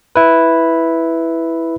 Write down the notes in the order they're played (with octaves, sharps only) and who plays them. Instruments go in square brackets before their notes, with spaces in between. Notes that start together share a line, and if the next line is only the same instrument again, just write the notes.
[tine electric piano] E4 B4